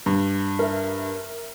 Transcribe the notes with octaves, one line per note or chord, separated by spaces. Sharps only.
G2
A#4 E5